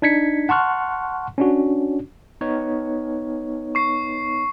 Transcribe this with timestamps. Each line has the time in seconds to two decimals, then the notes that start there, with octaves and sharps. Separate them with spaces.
0.02 D4 D#4 G#6 B6 C#7
0.49 F#5 A5 C6 C#6 F6 F#6
1.38 C#4 D4 F#4
2.41 B3 D#4 C#5
3.75 C#6 C7